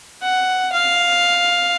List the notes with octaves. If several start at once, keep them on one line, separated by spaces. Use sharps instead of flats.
F#5
F5